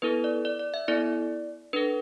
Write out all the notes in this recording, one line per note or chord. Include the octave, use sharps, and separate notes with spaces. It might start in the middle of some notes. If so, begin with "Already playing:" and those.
B3 E4 A4 B4
D5
D5
D5
E5
B3 E4 A4 D5
D4 A4 B4